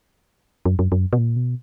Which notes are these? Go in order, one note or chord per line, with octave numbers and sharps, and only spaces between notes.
F#2
F#2
F#2
B2
A#2
B2